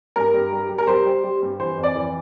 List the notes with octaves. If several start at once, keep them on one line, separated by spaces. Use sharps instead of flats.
G2 A#4
G2
G3
G3
A#4
G3 C5
G3
G3
G2
E3 C5
F2
D5
E3